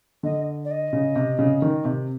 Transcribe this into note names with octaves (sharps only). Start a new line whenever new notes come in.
D3 D#5
D5
D#5
C#3
C3
C#3
D#3
C3